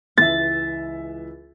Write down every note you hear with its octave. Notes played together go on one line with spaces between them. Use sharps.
C#2 E3 E5 A6